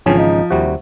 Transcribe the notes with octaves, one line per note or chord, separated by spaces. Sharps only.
G#1 C#3 E3 F3 C#4
D#4
D#2 C3 G3 F#4